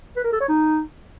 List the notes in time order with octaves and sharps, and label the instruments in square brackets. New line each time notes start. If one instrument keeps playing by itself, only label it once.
[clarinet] B4
A#4
A4
C#5
D#4